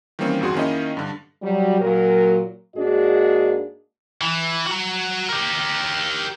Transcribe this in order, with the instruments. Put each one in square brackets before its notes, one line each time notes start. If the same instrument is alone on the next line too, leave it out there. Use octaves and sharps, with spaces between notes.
[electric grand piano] D#3 E3 G3 A#3 C4 C#4
G#1 F2 F#4 G#4 C6
D#3 A#3 C#4 E4 D#5
G2 D3
[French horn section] F#3 G3
A#2 F#3 A#4
G#2 A#3 D4 F#4 G#4 D#5
[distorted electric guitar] E3
F#4 A#5
G4 A#4